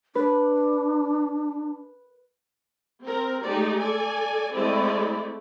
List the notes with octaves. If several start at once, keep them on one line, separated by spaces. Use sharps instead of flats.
D4 B4
C4 A#4
G#3 A3 D#4 G4 D5
A4 D5 G#5
G#3 A3 C4 E4 D5